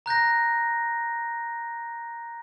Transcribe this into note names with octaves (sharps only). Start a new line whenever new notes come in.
A#5 F#6 G6 A#6